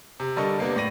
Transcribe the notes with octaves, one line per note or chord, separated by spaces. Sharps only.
C3
D3 G3 A4 A#4 D#5 C#6
C3 A#3 B3 D4
A2 D5 A#6 D#7